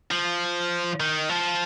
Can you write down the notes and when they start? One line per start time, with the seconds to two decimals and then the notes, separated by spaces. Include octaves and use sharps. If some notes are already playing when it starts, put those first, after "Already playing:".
0.11 F3
1.00 D#3
1.29 F3